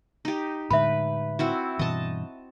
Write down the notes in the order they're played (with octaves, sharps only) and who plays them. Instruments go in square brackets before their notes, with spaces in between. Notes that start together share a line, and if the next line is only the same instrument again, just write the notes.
[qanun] D#4 G4
[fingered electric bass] A2 D3 G#3 [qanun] B4 [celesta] E5 B5
[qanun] C4 E4 F#4
[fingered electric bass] G2 B2 E3 [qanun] D#5 A5